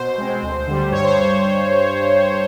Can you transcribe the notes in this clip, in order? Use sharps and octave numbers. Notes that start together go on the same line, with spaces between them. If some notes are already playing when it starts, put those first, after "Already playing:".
Already playing: B2 C5
G#3 C4
D2
D3 G3
G2 C#5
C5